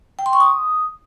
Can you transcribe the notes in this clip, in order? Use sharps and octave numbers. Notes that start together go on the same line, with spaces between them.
G5
C6
C#6
D#6